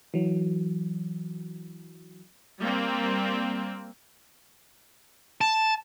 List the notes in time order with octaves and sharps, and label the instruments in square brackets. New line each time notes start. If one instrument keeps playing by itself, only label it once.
[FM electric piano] E3 F#3
[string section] G3 A#3 C4
[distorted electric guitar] A5